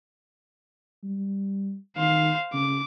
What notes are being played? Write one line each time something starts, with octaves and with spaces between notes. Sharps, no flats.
G3
D#3 C5 F5
C#3 D6